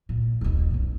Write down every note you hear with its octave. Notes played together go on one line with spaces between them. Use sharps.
A#2
D#1 B1
E2 C#4